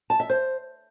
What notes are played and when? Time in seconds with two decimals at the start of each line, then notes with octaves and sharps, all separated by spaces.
0.10 A5
0.20 E5
0.30 C5